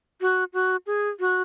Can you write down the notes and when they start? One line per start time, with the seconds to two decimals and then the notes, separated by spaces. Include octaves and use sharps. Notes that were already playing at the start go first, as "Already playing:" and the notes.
0.21 F#4
0.53 F#4
0.86 G#4
1.20 F#4